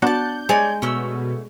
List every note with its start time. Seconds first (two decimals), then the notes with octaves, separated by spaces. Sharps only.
0.02 B3 D4 F#4 F#5 A5 G6
0.49 G#3 C#5 D5 G#5
0.82 B2 A3 C#4 E6